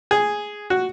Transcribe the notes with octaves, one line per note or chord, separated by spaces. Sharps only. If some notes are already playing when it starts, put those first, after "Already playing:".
G#4
F#4